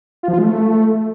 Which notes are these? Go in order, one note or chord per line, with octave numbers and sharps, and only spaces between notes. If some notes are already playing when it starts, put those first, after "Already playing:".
F4
F3
F4
G#3
A3